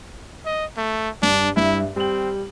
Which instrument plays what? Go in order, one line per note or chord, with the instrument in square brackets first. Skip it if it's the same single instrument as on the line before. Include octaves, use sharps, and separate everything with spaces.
[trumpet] D#5
A3
[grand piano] G2 [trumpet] D4
[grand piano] G2 E5 [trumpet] E4
[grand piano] G3 F#7 [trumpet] C4